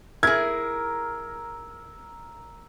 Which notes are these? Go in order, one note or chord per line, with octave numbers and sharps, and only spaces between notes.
E4 G#4 A#4 E6 G#6